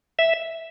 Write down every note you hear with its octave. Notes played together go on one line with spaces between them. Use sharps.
E5